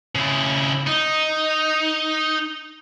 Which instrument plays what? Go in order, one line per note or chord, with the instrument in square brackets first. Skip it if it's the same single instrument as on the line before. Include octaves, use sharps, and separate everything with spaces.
[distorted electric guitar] C#3 E4
D#4